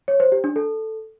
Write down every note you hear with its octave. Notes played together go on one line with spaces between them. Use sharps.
C#5
C5
G4
D4
A4